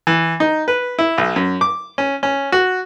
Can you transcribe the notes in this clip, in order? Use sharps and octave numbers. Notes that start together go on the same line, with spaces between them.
E3
D#4
B4
E4
B1
F#2
D6
C#4
C#4
F#4